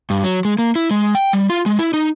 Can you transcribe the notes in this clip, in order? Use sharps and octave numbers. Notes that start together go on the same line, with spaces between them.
G2
F#3
G#3
A#3
E4
G#3
G5
G3
F4
G#3
E4
D#4